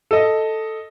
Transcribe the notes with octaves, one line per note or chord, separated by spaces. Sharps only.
A4 D#5